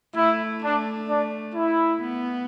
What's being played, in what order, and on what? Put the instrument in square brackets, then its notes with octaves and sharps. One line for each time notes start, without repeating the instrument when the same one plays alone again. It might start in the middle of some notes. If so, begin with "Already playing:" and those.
[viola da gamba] A3 [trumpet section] E4
[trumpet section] D4
D4
E4
[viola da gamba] B3